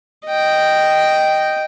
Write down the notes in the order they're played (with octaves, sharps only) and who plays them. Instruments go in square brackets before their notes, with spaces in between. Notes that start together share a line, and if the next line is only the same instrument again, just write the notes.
[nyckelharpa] D#5 G5